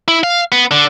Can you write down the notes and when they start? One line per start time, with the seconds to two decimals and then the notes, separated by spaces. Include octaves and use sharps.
0.08 E4
0.24 F5
0.52 B3
0.71 D3